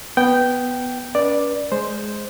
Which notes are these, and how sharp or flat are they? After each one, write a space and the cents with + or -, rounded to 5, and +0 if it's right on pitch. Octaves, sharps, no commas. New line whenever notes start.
B3 +0 G5 -10
C#4 +40 B4 -25 D5 +5
G#3 +10 C5 +0